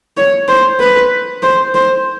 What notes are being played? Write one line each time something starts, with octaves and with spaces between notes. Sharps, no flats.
C#5
C5
B4
C5
C5